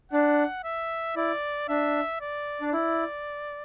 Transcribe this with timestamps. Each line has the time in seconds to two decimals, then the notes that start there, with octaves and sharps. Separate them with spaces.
0.12 D4 F#5
0.64 E5
1.16 E4 D5
1.68 D4 E5
2.21 D5
2.61 D4
2.73 E4 D5